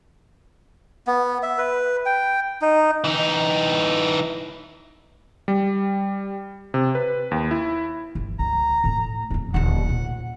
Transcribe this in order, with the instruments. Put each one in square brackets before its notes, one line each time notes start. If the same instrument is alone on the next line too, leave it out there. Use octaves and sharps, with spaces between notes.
[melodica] B3
E5
B4
G5
D#4
[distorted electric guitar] E3 D#4
[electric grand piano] G3
C3
B4
D#2
E4
[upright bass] G1
[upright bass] C#2 D3 [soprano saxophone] A#5
[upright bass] A2 B3
F2 B3
[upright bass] D#1 D2 [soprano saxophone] F#5
[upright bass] A#2 C#3